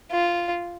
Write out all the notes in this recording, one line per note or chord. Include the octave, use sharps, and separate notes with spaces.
F4